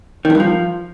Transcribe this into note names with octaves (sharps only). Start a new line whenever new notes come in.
D#3
F2
G2
F3